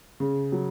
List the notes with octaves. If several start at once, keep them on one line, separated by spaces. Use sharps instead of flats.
C#3
F#3